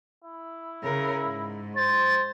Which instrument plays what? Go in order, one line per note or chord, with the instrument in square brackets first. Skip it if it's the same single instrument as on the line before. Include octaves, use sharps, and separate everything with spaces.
[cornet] E4
[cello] C#3 A#4
G#2
[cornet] C5 [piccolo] A6